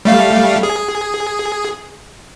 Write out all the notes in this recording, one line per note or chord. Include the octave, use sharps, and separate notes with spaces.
G3 A3 F5
G#4